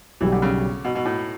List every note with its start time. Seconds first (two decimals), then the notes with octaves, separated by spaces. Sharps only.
0.21 B1 B2 E3 G3
0.32 D3
0.42 C#3
0.85 B2
0.95 B2
1.05 A2